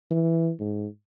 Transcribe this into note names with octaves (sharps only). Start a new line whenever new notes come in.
E3
G#2